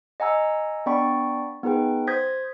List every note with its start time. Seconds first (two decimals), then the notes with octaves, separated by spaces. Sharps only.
0.20 D#5 F#5 G#5 A#5 E6
0.86 B3 D4 D5 G5 B5 C#6
1.63 B3 D#4 G#4 B4 G5
2.07 C5 D#6 G6 G#6 A#6 B6